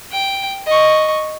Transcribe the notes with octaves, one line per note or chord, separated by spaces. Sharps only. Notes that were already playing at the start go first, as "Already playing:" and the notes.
G5
D#5 C#6